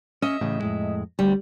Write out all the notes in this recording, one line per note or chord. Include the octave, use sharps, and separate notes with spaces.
C#4 D#5 E5
A1 A2 C#3
F2 A2 G#3
D2 G3